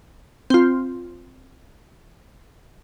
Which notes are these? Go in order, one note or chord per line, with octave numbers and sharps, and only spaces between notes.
C4 F4